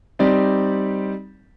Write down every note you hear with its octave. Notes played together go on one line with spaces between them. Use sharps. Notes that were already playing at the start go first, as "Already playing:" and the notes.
G3 C4 D#4 G4 D5